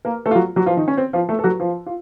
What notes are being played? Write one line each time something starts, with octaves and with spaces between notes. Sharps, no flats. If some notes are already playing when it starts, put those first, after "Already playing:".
A#3 A#4
A3 A4
F4
F#3 F#4
F#3 F#4
F3 F4
D#3 D#4
C#4
C4
F3 F4
A3 A4
A4
F#3 F#4
F3 F4
F4